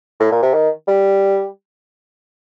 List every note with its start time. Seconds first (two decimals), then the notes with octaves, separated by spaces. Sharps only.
0.20 A2
0.32 A#2
0.42 C3
0.54 D#3
0.88 G3